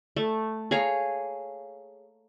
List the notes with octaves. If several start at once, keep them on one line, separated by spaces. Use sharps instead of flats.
A3
G#4 C#5 F5 A#5